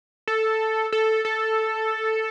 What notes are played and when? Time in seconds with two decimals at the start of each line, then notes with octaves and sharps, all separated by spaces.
0.28 A4
0.92 A4
1.25 A4